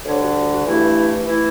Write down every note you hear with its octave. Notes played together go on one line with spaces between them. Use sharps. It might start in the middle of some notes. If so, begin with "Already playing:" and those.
D2 D3 G3 C#5
F#4
F#4
G2 E3 A3 E4
E3 A3 E4